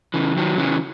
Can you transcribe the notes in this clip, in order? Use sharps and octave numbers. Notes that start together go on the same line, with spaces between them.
C#3 E3
D#3 F#3
C#3 E3